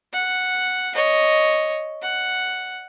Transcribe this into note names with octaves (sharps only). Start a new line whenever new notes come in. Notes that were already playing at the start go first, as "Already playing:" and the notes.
F#5
C#5 D#5
F#5